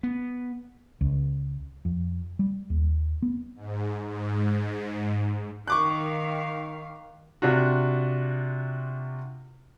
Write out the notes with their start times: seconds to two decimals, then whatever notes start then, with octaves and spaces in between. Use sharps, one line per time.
0.03 B3
1.01 C#2
1.85 F2
2.39 G3
2.70 D#2
3.22 B3
3.56 G#2
4.07 G#2
5.68 D#3 F5 C#6 D6 F#6
7.42 C3 D4 F4 F#4